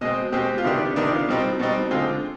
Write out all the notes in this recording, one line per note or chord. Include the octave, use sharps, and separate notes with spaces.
B2 G#3 C4 D#5
B2 G#3 C4 G4
F4
C3 D#3 B3 D4 G4
C3 D#3 B3 D4
F4
B2 G3 C4 D#4
B2 G3 C4 D#4
D3 G#3 C4 F4